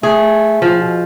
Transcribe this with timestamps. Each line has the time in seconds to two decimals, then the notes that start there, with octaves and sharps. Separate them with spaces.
0.03 A3 G#4
0.62 A2 F3
0.80 B2